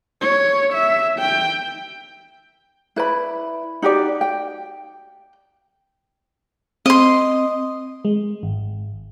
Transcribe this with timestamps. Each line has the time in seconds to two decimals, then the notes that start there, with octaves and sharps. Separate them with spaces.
0.21 C#5
0.74 E5
1.19 G5
2.96 E4 B4 D5 B5
3.82 D#4 F#4 G4 D5
4.21 G5
6.86 C4 D#5 C6
8.05 G#3
8.43 G#1